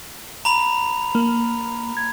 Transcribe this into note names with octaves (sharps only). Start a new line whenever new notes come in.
A#5 B5 F7
A#3
G#6